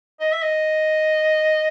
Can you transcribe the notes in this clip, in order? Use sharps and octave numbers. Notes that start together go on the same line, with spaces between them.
D#5
E5
D#5